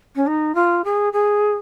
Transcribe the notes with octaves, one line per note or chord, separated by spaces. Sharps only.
C#4
D#4
F4
G#4
G#4